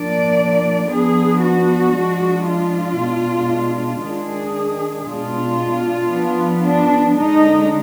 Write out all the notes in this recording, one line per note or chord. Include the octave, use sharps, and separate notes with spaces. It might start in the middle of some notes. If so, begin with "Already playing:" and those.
Already playing: F3 A#3 D4 D5
F3 B3 D4 G#4
F#4
F3 G#3 D4
F4
B2 G#3 D4
D#3 G#3 D4 G#4
B2 G#3 D4 F4
F3 B3 D4
D4
D3 G#3 D4 D#4